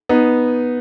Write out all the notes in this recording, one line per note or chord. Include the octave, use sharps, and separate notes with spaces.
B3 D#4